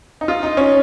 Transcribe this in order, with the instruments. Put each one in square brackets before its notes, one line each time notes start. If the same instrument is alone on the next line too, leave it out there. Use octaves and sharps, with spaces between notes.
[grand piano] D#4
F4
D#4
C#4